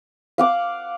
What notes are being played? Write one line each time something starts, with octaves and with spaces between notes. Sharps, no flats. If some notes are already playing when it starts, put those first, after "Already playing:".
F5 F#5 D6